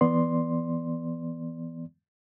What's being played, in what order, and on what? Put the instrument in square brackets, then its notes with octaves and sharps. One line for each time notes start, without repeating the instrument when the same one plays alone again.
[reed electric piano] E3 B3 D5 C6